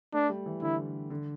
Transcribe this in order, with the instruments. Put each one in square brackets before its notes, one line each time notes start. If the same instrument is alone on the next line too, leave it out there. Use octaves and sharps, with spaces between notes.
[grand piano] A3 [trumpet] D4
[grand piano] G3
E3
[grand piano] D3 [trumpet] E4
[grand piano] D3